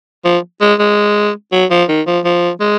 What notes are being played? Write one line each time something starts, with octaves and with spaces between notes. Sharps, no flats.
F3
G#3
G#3
F#3
F3
D#3
F3
F3
G#3